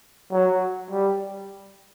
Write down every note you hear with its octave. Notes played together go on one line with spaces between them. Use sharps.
F#3
G3